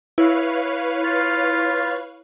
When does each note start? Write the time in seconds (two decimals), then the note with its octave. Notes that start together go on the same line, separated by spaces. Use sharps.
0.18 E4 B4 C#5 F5
1.04 F4